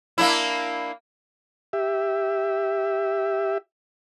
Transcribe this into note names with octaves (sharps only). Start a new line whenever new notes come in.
A#3 D4 E4
G4 E5